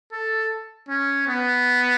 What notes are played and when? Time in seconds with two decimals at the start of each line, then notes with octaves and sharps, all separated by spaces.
0.12 A4
0.88 C#4
1.27 B3